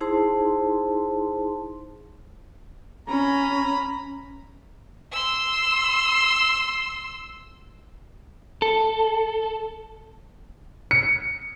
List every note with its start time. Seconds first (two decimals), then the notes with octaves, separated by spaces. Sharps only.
0.01 D#4 E4 G#4 C5 A5 C6
3.08 C#4 A#5 B5
5.12 C6 E6
8.62 A4
10.91 C#7